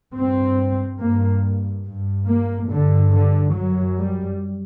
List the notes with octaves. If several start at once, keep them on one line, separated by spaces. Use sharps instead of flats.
G2 C4
G2 A#3
G2
A#3
G2 D3
D3
F#2 F#3
G3